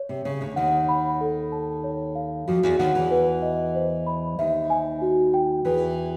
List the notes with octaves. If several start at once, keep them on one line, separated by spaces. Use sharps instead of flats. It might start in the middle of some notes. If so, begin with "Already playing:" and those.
Already playing: C#5
C3
C#3 C#5
D2 D3
D#2 D#3 F#5
B5
A4
A5
C#5
F5
F2 F3 F#4
E2 E3
D#2 D#3 F#5
E2 E3
B4
D#5
C5
B5
D#2 D#3 E5
G#5
F#4
G5
E2 E3 B4
E5